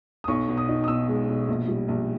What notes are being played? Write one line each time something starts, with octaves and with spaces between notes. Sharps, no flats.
D#6
B1 C#6
B2
D#6
D#4
D#6
B2 E6
G#3
B2
A#1
G3
A#1